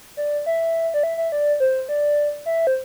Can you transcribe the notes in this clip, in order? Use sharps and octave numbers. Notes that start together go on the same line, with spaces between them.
D5
E5
D5
E5
E5
D5
C5
D5
E5
C5